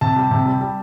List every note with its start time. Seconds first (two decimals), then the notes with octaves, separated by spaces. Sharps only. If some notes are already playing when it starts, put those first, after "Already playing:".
0.01 C3 A5
0.16 G3
0.31 C3
0.46 G3
0.61 G3